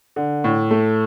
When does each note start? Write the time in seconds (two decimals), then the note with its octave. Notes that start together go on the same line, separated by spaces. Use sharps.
0.16 D3
0.44 A2
0.71 A3